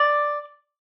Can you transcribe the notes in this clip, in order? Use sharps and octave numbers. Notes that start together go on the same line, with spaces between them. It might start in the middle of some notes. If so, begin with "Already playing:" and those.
Already playing: D5